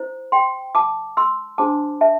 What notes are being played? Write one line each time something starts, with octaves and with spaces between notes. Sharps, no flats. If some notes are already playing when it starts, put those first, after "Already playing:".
Already playing: E4 C5
G5 C6
A5 D6
C6 E6
D4 G4 C5 A5 D6
E5 A5